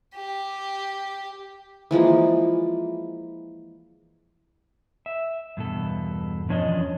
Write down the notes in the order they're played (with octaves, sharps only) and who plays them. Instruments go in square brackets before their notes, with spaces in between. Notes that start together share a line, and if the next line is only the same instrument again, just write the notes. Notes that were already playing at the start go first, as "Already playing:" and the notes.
[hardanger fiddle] G4
[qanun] E3 F3 G#3 A#3
[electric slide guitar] E5
E2 G2 B2 A4
E2 F3 C#4 D4 C#5 D#5